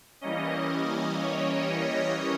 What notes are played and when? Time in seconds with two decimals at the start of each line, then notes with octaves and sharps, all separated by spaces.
0.21 E3 G3 A#3 C#4 D#5
1.20 C#5